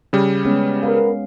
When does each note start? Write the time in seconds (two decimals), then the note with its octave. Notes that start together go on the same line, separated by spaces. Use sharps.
0.13 C#3 G3
0.45 G#3 B3 C#4
0.83 B3 A#4 F5